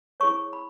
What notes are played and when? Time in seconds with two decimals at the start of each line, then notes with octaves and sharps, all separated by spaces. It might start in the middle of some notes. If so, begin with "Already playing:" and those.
0.20 E4 G#4 C#5 C#6
0.53 B5